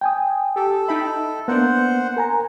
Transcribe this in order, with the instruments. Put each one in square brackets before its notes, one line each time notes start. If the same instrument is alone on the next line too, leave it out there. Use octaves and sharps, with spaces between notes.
[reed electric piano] G5 G#5 D#6
[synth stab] G4 [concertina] A4
[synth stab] D#4 G5 B5 [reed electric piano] E5
[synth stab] A#3 D4 [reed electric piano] B3 [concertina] C5 F#5
[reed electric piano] A#4 G#5 A#5